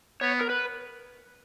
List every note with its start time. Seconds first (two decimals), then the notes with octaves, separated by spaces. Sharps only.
0.21 B3 C#5
0.41 A#4
0.50 B4